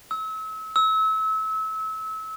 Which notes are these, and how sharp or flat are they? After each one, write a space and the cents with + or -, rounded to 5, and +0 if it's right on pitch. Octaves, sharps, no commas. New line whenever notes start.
E6 -35
E6 -30